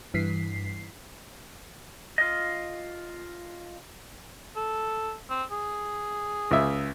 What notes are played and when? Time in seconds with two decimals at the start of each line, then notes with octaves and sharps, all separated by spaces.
0.14 G2 E3 B6 C7
2.18 F4 D#5
4.57 A4
5.30 C4
5.51 G#4
6.51 C#2 E5